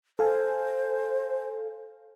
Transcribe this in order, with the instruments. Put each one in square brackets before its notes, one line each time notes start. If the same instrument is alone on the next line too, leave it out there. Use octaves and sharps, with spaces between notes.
[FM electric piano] A4 F5 G#5 [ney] C5